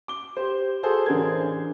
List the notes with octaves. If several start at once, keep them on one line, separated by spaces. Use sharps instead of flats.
D6 G7
G4 C5
F#4 G#4 A4 C5
A1 D3 G#4 A#4 C5 G#6